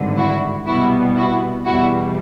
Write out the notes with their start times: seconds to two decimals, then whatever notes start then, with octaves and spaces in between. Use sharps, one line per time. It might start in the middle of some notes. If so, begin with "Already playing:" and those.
Already playing: G#1 G2 D3
0.17 E4 F#4
0.66 C2 B2 G3 B3 E4 F#4
1.16 E4 F#4
1.65 E2 B2 G3 E4 F#4